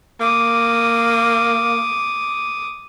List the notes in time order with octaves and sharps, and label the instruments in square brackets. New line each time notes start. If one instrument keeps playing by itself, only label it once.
[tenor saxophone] A#3 [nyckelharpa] D6 D#6